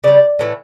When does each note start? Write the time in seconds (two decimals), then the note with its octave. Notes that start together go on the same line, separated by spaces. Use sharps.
0.04 C#3 G3 D5
0.39 A2 E3 A3